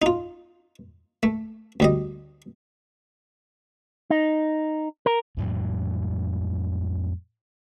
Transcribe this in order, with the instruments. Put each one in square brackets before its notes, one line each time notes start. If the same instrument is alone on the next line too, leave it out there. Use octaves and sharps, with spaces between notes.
[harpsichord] D#4 F4
A3
D2 G3 D#5
[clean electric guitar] D#4
A#4
[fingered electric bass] F2 A2 F#3